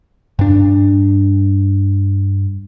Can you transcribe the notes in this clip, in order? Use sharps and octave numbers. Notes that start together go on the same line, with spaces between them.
G2 D4